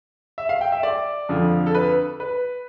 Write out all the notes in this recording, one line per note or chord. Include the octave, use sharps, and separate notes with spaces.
E5
F5
G5
E5
D5
F2 D3 F3
A4
B4
B4